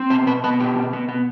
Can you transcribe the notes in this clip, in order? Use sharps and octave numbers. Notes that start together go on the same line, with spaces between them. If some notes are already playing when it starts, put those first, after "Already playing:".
Already playing: C4
B2 C5
B2 B4
B3 B4
B2 G4
B2
B3
B3